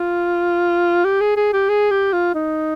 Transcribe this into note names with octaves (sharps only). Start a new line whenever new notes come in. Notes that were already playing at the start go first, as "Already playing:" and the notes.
Already playing: F4
G4
G#4
G#4
G4
G#4
G4
F4
D#4